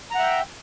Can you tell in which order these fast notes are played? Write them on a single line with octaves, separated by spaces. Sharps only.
A#5 F#5 E5 G5